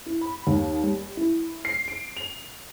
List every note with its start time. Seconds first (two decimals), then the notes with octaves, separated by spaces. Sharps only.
0.06 E4
0.21 B5
0.47 D#2
0.83 G3
1.17 E4
1.65 C7
1.88 D7
2.17 F7